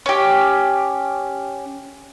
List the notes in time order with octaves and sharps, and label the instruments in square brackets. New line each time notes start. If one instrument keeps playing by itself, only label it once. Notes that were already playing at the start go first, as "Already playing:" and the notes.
[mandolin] C#4 G4